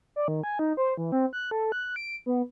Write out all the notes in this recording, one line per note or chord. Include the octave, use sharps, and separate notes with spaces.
D5
D#3
G#5
D#4
C5
E3
C4
F#6
A4
F#6
D7
B3